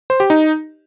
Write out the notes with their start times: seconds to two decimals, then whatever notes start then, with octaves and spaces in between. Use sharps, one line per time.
0.10 C5
0.20 G4
0.30 D#4